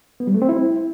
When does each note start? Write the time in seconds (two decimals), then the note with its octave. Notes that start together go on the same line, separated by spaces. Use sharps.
0.20 B3
0.27 G3
0.35 A3
0.42 C4
0.49 E4